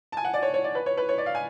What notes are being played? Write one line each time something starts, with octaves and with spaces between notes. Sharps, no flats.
A5
G#5
F#5
D5
C#5
C#5
D5
B4
C#5
B4
C#5
D5
F5
G#5